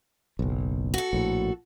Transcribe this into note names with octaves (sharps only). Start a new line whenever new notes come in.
F#1 B1
F#4 A4
A#1 A2